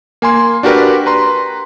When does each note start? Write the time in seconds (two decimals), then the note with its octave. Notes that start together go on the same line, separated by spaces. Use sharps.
0.22 A#3 G#5 C6
0.63 D4 F#4 G4 A#4 B4 D5
1.06 B4 A#5 C6